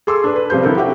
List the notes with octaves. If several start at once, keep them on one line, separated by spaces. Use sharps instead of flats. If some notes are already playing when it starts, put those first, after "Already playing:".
G#4 A4 C6 D6 E6
D4 B4
B4
C3 F3 G3 C5 G6
D3 E4 A4 A#4
F#4 G4 E5 F#5 G5